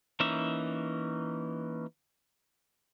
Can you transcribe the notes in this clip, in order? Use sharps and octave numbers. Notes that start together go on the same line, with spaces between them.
E3 A#3 C#4 D#4 E5